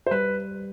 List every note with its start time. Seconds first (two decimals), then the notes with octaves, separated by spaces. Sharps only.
0.06 C5
0.11 G3 B4